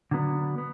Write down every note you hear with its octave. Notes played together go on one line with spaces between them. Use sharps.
D3 F#3 B3 D4
B3